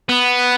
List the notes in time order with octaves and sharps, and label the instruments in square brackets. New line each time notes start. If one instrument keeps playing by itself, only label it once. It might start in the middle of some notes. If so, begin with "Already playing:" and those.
[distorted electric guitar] B3